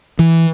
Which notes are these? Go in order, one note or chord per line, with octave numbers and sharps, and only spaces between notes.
E3